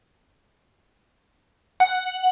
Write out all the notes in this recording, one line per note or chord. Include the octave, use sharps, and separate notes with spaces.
F#5